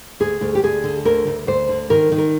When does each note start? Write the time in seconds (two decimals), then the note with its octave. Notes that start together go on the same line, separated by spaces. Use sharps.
0.20 D2 G#4
0.41 D2
0.55 G4
0.63 D2 G#4
0.84 D3
1.05 D2 A#4
1.27 D2
1.47 D2 C5
1.69 D3
1.90 D#3 A#4
2.12 D#3
2.18 A#4